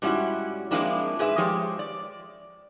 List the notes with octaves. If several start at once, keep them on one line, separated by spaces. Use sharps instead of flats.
G#2 G3 C#4 E4 F#4
F3 G#3 A#3 C4 D4 E4
G#2 G#4 B4 E5
F3 G#3 G4 C#5
D5